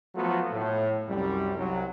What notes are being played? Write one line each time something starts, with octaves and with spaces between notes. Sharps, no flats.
F3 F#3 A3 B3 F4 F#4
A2
C2 F#2 G3
C2 F#3